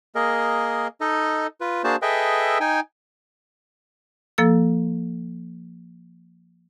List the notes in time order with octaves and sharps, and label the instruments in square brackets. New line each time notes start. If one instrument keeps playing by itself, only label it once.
[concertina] A#3 G#4 A#4 D#5
D#4 A4 D#5
F4 B4
A#3 D4 F#4 G#4 C5 A5
G#4 A4 B4 D#5 E5 G5
D#4 G5 G#5
[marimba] F3 A#3 A4 E6